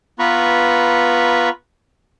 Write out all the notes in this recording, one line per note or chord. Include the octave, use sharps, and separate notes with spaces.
B3 F4 B4 A#5 B5 C#6